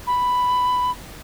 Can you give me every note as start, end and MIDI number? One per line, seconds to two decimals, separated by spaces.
0.07 0.90 83